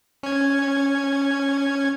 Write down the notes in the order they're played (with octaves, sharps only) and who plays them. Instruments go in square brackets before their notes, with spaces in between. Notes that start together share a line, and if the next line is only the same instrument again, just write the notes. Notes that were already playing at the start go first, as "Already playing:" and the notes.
[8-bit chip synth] C#4 G#6